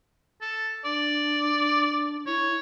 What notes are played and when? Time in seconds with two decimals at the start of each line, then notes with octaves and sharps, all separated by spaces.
0.42 A4
0.85 D4 D5
2.26 E4 C#5